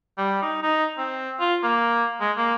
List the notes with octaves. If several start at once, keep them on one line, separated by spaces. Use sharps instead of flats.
G3
D#4
D#4
C4
F4
A#3
G#3
A#3